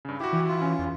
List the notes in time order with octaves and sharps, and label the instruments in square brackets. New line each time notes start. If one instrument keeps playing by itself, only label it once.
[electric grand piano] G2 C#3
[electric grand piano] E4 F#4 [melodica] G4
[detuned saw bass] E3
[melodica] F4
[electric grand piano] C#4
[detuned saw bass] E2